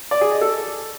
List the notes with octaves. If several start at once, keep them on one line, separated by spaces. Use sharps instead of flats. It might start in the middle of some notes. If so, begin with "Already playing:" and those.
D5
G#4
D#5
A4